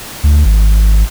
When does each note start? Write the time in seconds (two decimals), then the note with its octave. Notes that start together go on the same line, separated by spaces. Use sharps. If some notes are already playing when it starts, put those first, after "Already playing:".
0.24 D2
0.45 G#1